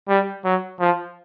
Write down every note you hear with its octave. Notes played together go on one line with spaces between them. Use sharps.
G3
F#3
F3